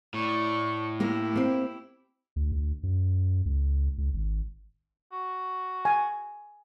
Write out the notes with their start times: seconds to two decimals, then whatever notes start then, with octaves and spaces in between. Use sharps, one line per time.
0.14 A2 D5 C#6
1.00 A#3 E4 G4 A#4
1.35 A#3 C4
2.36 D2
2.52 D2
2.83 F#2
3.45 C#2
3.98 C#2
4.14 G#1
5.12 F#4
5.85 G#5